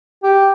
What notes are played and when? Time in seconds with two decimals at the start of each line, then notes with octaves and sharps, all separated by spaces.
0.23 G4